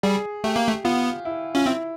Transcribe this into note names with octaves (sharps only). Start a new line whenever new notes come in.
G3 G#4
A3 G4
A#3
A3
B3 F4
E4
C#4 F4
C4 E4